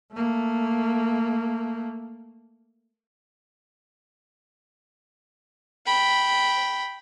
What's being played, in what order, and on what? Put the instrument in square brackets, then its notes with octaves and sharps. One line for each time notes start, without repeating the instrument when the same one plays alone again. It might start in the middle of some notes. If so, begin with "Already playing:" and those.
[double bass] A3 A#3
[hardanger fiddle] G5 B5